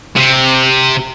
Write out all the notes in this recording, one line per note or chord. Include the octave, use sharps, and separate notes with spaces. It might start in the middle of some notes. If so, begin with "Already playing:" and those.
C3